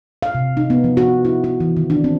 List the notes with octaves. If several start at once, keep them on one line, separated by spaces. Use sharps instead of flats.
F5
C3
D#4
B3
F3
F#4
E4
F#4
E3
D#3
D4
C4